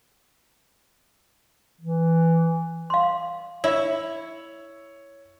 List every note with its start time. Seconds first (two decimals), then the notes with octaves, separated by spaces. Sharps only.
1.81 E3
2.90 F5 C6
3.64 E4 C#5 E5